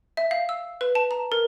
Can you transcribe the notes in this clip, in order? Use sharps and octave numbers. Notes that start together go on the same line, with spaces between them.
E5
F5
E6
B4
A5
A#5
A#4